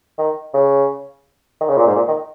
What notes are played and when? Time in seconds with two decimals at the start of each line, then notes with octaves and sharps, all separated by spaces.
0.19 D#3
0.54 C#3
1.61 D#3
1.69 C#3
1.77 A#2
1.87 G#2
1.96 A#2
2.08 D#3